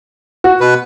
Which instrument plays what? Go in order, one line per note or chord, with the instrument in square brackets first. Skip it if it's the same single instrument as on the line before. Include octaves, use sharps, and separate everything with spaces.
[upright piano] F#4
[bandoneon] B2 B4